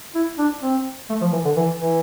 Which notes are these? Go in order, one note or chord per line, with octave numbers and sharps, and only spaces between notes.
E4
D4
C4
A3
F3
E3
D3
E3
E3